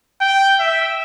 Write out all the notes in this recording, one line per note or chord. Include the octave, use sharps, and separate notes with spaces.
G5
E5